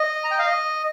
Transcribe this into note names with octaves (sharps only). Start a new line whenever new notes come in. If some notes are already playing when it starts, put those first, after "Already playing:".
Already playing: D#5
A#5
G5
F5
D#5